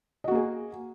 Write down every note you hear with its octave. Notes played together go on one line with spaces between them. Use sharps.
A#3 F#4 G#4 D#5